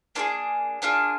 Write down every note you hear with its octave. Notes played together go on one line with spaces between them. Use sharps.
A#3 D4 F4 G#4
A#3 D4 F4 G#4